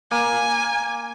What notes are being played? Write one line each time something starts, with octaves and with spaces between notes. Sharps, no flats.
A#3 G#5